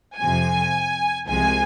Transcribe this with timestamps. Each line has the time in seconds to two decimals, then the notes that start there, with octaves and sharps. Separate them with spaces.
0.19 F2 C3 F3 G#5
1.28 C2 C3 F3 G#3 G#5